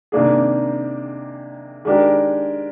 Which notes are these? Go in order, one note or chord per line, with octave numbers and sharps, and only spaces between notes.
C3 D#3 A#3 D4 G#4
D#3 G#3 D4 G4 A#4